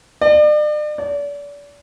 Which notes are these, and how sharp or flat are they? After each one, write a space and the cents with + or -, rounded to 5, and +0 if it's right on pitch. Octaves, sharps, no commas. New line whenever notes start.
D5 +40
D5 -35